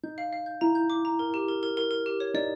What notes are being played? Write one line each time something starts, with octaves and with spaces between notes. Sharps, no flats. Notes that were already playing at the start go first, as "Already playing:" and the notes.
D#4 G6
F5
F5
G6
E4 A#5
G6
D6
A#5
A#4
G4
A#4
A#4
A#4
A#4
G4
C#5
D#4 D5